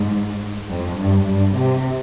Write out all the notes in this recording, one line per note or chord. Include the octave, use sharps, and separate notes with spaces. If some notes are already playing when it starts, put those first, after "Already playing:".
Already playing: G#2
F2
G2
G2
C3